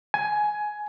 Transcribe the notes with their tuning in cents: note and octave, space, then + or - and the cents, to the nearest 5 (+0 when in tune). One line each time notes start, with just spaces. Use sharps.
G#5 +15